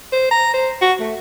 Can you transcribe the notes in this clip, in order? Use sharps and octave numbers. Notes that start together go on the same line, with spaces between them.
C5
A#5
C5
F#4
A3